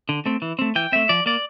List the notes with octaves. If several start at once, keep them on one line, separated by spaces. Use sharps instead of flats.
D3
A3 C4
E3
A3 C4
E3 G5
A3 C4 E5
F3 D5
A#3 D5